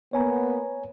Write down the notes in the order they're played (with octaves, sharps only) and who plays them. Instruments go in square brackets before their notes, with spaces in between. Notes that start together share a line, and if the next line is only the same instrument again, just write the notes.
[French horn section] A#3 B3 [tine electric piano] C#5 G#5 A#5